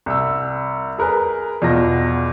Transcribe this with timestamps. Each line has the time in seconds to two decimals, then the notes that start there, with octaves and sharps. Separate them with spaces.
0.06 C2 E6
0.98 G#4 A#4 B4
1.62 E2 B2 F4 A#6